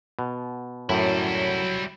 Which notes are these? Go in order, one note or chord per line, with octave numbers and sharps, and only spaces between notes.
B2
F#2 A2 F#3 G3 E4